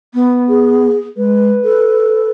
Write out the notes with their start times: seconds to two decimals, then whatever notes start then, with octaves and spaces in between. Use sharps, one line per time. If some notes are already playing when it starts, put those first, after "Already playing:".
0.14 B3
0.49 G#4
1.17 G#3 B4
1.64 A4